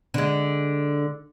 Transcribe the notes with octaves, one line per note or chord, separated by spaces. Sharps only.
D3 G#3